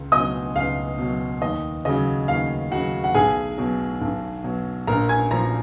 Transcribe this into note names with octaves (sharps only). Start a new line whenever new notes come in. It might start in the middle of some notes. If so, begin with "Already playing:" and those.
Already playing: C#2
B2 F#3 D#5 D#6
C#2 F5
B2 F#3
D#2 D#5
C#3 F#3 D#5
D#2 F5
C#3 F#3 F#4 F#5
F#5
B1 G#4 G#5
B2 F#3
B1
B2 F#3
A#1 A#4 A#5
G#5 G#6
A#2 F3 A#5 A#6